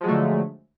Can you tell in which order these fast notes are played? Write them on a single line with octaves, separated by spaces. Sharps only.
F3 G#3 F#3 A3 D3